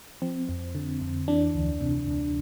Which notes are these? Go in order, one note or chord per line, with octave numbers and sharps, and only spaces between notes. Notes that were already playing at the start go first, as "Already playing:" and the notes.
F3 C4
F2
D3
F2
E3 D4
D2
C3
D2